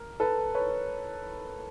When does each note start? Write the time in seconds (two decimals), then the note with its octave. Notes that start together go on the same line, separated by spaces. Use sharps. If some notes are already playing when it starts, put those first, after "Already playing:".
Already playing: A#4
0.20 A4 B4
0.55 B4 C#5